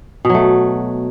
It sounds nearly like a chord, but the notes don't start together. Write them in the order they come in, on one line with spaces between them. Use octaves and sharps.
B2 F#3 A3